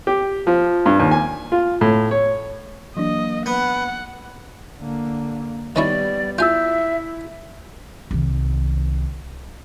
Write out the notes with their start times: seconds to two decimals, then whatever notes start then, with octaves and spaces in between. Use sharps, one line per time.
0.07 G4
0.47 F3
0.86 G2
1.00 D#2
1.11 G#5
1.52 F4
1.81 A2
2.11 C#5
2.97 E3 F#3 A#3 D4 D#5
3.46 B3 F#5
4.79 D3 A#3
5.76 D#3 G3 B3 C#4 E4 D5
6.38 E4 F4 E5 G#5 E6 G6
8.11 C2 D#3